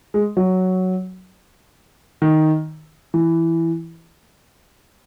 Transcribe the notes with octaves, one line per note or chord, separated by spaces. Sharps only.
G#3
F#3
D#3
E3